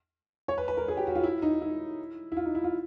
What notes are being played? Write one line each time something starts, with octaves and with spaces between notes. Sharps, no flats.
C#5
B4
B4
A#4
G#4
G4
F#4
F4
E4
D#4
E4
E4
F4
D#4
E4
F4